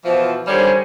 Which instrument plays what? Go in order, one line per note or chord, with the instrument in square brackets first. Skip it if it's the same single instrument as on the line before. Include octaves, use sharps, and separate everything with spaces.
[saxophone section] B2 E3 F3
[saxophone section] D3 D#3 G3 [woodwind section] C5 C#5 G#5